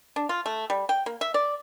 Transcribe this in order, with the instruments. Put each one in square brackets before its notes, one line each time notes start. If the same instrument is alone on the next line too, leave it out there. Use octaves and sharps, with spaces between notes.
[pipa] D4
F4
A3
G3
G5
A#3
E5
D5